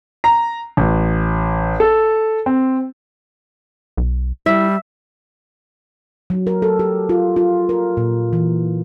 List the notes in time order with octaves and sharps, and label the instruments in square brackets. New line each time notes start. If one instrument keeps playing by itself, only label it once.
[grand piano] A#5
A1
A4
C4
[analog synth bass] B1
[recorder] G3 [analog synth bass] E4 [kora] E5
[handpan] F#3
A#4
A4
G4
F4
F4
A#4
A#2
E3